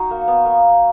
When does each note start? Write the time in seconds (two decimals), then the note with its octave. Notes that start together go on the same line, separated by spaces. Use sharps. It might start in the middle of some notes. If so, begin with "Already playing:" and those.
Already playing: D#4 F#4
0.11 A#3
0.28 B3
0.45 A#3